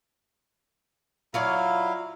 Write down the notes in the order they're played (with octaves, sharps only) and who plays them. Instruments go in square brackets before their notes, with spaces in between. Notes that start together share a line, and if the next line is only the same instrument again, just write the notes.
[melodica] F#3 E4 F5 [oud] F4 C#5 D5